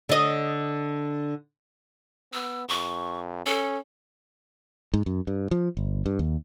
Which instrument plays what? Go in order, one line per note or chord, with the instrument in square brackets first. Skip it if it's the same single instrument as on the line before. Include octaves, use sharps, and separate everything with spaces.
[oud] D3 D#5
[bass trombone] B3 [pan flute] E6
[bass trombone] F2 [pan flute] C#6
[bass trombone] C#4 [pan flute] A4
[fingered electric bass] G#2
F#2
G2
F3
G1
G2
D#2